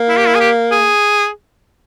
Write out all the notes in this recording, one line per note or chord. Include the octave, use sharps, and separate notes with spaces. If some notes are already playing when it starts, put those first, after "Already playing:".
Already playing: A#3
E4
G4
E4
G#4
G4
G#4